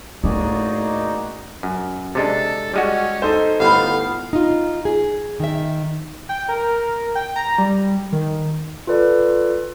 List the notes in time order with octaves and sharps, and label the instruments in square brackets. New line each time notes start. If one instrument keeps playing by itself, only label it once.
[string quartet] A2 [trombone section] A#3 D#4 [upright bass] C#4 [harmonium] F#4 G#4 D5
[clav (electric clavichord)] F#2
[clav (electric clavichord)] C3 G#3 D4 [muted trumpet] A4
[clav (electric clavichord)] G3 G#3 F#4 [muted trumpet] C#4
[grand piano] D#4 A4 C5
[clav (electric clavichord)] G1 A2 [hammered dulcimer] B3 [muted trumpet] F5
[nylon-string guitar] D#4 F4
G#4
D#3 E5
[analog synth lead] G5
A#4
G5
A#5
G3
D#3
[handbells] F4 A4 B4 D5